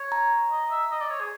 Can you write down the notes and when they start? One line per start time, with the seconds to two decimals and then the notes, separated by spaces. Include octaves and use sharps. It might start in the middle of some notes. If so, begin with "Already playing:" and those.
Already playing: C#5
0.12 A#5
0.51 D#5
0.71 E5
0.91 D#5
1.01 D5
1.10 C#5
1.20 G#4